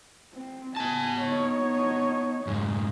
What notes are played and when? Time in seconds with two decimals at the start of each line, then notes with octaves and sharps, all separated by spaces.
0.34 C4
0.76 B3 G#5 A5
1.22 D#4 C#5
2.47 F2 G#2